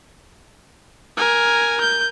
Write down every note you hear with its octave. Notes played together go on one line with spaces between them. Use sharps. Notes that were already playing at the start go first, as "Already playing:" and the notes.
A#4 G#5
G6